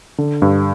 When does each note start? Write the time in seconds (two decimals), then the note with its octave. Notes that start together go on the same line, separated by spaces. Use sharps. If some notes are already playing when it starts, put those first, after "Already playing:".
0.18 D3
0.42 G2